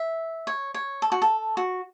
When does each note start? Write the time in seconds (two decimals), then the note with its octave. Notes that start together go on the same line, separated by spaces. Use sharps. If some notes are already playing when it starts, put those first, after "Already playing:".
Already playing: E5
0.47 C#5
0.74 C#5
1.02 A4
1.12 F#4
1.22 A4
1.57 F#4